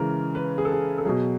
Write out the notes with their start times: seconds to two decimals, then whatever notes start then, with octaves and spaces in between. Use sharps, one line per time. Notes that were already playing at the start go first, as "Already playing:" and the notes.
Already playing: C#3 E3 G#3 A#4
0.35 B4
0.58 G#4
0.65 A4
0.72 G#4
0.98 A4
1.05 B2 F#3 G#4